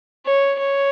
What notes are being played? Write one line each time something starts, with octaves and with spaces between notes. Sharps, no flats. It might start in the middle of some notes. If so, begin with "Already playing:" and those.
C#5
C#5